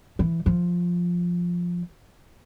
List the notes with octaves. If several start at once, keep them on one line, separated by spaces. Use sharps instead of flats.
E3
F3